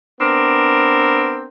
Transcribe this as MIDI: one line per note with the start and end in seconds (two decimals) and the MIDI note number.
0.19 1.48 59
0.19 1.48 60
0.19 1.48 62
0.19 1.48 70